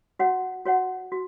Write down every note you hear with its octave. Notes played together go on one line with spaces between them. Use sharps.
F#4 C#5 F#5
F#4 C#5 F#5
F#4